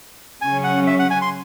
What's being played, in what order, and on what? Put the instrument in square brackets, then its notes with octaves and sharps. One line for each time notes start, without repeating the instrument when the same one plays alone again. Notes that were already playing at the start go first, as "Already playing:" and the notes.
[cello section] C#3 F#3 C#4 [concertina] G#5
[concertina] F#5
E5
F#5
G#5
C6